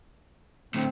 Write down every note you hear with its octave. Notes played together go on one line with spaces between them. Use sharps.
A2 D3 C4